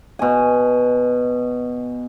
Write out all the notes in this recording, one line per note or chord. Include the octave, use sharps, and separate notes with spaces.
B2 G#5